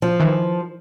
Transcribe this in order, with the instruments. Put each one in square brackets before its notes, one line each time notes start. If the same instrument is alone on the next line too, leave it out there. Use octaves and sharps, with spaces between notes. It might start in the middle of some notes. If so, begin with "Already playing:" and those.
[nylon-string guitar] F3
[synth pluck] D#3 E3